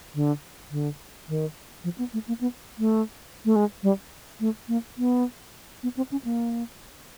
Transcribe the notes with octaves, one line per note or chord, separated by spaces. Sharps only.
D3
D3
D#3
F3
B3
A3
A#3
B3
A3
A3
G#3
G3
A3
A#3
B3
B3
C4
C#4
A#3